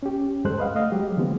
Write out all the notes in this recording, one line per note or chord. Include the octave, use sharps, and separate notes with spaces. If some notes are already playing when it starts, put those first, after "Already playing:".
C#4 G4
D2 G2 G#3 A4 C5 F#6
B4 D#5 F5 F#5
A3 D#5 F5
F#3 G#3 G4
D3 F3 G#3 B3 C4